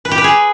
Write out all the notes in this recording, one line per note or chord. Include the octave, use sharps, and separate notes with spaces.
B4
G4
B4
G#4